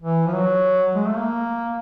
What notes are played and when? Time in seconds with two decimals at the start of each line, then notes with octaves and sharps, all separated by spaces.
0.02 E3
0.27 F3
0.34 F#3
0.95 G#3
1.06 A3
1.17 A#3